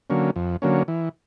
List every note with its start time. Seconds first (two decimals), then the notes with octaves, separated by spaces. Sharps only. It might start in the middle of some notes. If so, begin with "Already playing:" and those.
0.10 D3 F#3 A#3 C#4
0.36 F2
0.62 D3 F#3 A#3 C#4
0.88 E3